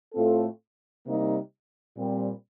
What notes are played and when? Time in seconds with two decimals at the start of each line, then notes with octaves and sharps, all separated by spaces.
0.14 A2 A3 C4 F4 A4
1.06 C3 G3 A#3 D#4
1.97 A#2 G3 C4